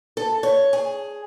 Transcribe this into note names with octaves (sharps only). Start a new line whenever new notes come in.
A4
C#5
G#4